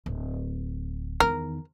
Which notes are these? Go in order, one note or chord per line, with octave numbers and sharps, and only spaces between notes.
D1
E2 D#3 A#4